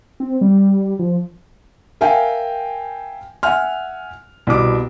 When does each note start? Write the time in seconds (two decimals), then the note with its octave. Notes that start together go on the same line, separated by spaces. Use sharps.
0.20 C4
0.41 G3
0.99 F3
2.01 A#4 E5 F5 G5 G#5
3.43 E5 F#5 G#5 F6
4.47 C2 B2 D6